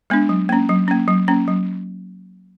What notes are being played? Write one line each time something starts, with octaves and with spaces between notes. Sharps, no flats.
G#3 B3 D4
F#3
A#3 C#4
F#3
A#3 C#4
F#3
A#3 C#4
F#3